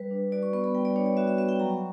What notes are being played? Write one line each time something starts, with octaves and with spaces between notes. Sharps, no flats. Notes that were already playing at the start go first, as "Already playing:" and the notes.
Already playing: G3 B4
D4
F#4 D5
C#6
B3 C#6
B5
G3 G5
D5
D4 C#5
D5
F#4 E5
E5
B3 E5
G5
F#3 A#5
C#6